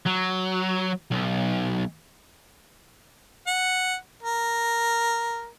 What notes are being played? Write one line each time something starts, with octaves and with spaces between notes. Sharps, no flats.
F#3
B1
F#5
A#4